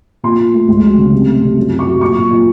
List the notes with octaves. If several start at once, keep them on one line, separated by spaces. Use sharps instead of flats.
A#2 C6
A#2
A3
C#2
F#3
C#3
C3
A3
C3
F#2
F#3
C#6
F#3
A#2 C#6
A#2
A#2